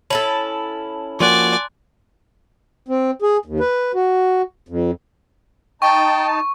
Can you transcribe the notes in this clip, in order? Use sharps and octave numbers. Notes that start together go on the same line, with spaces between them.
C#4 E4 A4 A5 B5 F#7
F3 A#3 F#4 D5 G#5 C6 F#6
C4
G#4
D#2
B4
F#4
F2
D#4 G5 A5 C#6